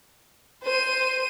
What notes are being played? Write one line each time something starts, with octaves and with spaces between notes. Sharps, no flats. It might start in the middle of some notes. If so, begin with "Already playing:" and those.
C5 D#7